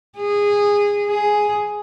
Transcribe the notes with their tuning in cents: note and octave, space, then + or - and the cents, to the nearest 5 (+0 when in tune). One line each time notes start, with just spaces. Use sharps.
G#4 -20
G#4 +5